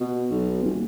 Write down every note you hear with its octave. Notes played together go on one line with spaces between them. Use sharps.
B2
B1
D#1